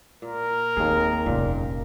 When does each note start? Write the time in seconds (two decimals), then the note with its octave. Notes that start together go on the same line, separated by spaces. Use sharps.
0.22 A#2 A#4
0.77 D#2 A#3 C4 G#4
1.26 F1 A#2 C#4